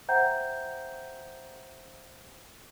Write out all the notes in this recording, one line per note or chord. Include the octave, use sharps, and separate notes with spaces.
C5 E5 F#5 G5 A#5 G6